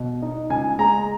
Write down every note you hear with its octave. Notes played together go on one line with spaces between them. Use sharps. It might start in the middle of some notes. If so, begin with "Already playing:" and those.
Already playing: B2
D#4
C#2 G#5
G#3 A#5